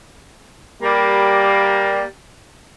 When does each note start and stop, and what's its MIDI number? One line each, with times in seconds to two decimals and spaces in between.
0.83 2.03 55
0.83 2.03 58